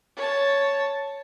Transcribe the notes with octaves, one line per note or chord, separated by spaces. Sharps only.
C#5 A5